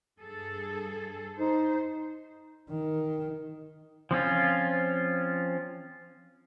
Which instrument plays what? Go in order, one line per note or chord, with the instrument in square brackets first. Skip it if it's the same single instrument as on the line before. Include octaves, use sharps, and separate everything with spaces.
[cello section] G2 G#4 A4
[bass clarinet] D#4 [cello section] C5
[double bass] D#3
[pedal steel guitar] F3 C4 C#4 F4